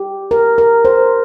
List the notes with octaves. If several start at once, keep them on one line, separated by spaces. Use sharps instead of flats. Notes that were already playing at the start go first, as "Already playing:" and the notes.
Already playing: G4
A#4
A#4
C5